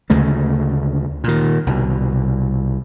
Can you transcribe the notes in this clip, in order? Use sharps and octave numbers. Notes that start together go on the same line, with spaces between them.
D2 C#3 G#3 A3
A#2 D#3
C2 B2